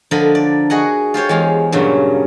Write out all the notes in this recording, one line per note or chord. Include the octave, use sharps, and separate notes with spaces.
D3 F3 D4 A#4 D#5 B5
D5
F#4 G#4 D#5 F#5
F4 G4 C5 C#5
E2 G#3 F5
G2 A#2 C#3 F#3